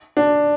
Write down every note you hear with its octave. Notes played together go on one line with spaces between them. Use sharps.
D4